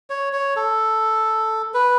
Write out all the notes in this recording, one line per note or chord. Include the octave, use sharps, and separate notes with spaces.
C#5
C#5
A4
B4